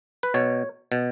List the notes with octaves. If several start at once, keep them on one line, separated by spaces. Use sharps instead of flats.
B4
B2 C#5
B2